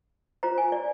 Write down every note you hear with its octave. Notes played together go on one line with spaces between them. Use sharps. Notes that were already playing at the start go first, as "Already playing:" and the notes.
F4 C5 A#5
G#5
D5